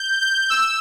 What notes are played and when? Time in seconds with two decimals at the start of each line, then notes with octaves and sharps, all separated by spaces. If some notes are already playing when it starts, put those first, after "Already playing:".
Already playing: G6
0.21 G6
0.50 E6